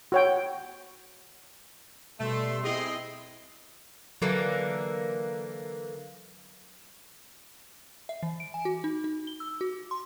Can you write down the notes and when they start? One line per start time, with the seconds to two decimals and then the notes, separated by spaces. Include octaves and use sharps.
0.12 F#4 C#5 G5
2.20 B2 G3 A3 C6
2.64 C4 E4 G#4 D#5 C7
4.22 D3 E3 F#3 A#3 A4 B4
8.09 E5
8.23 E3
8.40 D7
8.54 G#5
8.65 F#4
8.84 D#4
9.04 D#4
9.27 G7
9.40 E6
9.61 F#4
9.91 C6